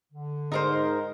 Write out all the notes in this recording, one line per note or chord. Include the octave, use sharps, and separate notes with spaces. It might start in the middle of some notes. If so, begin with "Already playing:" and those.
D3
G#2 D#4 A#4 C5